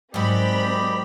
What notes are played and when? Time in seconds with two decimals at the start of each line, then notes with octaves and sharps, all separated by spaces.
0.14 G#2 F#3 C4 G4 A#4 D5 D#5 B5